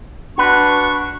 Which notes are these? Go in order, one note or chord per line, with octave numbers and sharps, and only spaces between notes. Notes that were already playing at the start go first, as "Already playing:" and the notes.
D4 F#4 B4 C#6